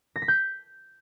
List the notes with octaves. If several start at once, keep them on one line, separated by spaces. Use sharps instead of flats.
A#6
B6
G6